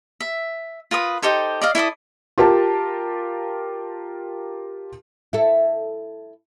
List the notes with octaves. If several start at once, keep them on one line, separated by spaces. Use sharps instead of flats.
E5
F4 A#4 B4 D#6
D#4 G4 A4 C5
D5 D#5 F5
E4 A4 D5 D#6
F4 G4 A#4 A5
E4 A4